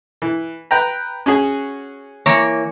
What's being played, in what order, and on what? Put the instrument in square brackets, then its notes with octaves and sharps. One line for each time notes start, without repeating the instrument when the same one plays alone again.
[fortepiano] E3
B4 G5 A#5
C#4 F#4 G#4
[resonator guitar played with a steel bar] E3 A#3 C#5